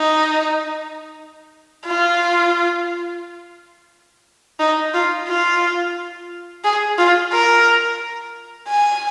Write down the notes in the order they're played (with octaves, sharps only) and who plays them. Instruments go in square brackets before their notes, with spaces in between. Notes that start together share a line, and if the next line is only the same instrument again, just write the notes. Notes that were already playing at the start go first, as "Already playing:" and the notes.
Already playing: [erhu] D#4
F4
D#4
F4
F4
G#4
F4
A#4
G#5